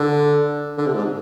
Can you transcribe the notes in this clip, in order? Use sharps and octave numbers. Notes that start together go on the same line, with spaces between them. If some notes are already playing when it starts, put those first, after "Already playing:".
Already playing: D3
D3
C3
G#2